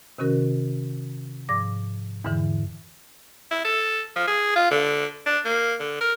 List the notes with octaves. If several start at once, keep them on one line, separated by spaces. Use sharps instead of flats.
C3 D#3 C#4 F#4 A#4
G#2 F3 D5 D6 A#6
E2 G#2 D3 E3
E4
A4
F3
G#4
F4
D3
D4
A#3
D3
A#4